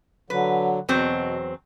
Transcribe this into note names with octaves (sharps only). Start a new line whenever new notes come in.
D3 F#3 B4
E2 B2 F#3 C4